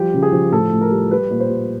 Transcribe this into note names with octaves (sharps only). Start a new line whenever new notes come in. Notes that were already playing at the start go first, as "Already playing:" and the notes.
Already playing: F3 G3 G4
C#3
G#4
F3
A2 A4
A2
A#4
G3
G3 B4
A#2
C5
G3